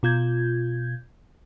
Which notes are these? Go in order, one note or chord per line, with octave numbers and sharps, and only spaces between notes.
B2 F4 G6 G#6